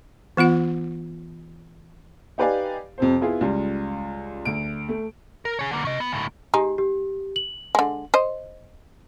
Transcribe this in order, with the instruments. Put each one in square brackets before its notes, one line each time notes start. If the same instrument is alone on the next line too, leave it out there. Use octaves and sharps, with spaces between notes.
[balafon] E3 B3 F4 F#5
[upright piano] D#4 G4 B4 D5 F5 G#5
F2 C3 C5
B3 E4 F4 G#4
C#2 G3 F4
D2 D7
A3
[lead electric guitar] A#4
G#4 C#5
D3 A#3
C#4 D#5
B3
D2 A2
[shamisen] G#3 D#4 [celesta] G4
[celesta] G4
F#7
[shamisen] D3 G#3
C5 D#5